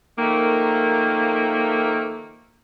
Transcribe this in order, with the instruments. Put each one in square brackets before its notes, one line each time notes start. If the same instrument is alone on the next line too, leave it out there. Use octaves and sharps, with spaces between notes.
[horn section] D#3 F3 A3 A#3